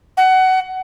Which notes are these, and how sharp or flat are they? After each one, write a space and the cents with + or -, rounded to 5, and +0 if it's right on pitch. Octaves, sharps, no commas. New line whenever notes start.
F#5 +20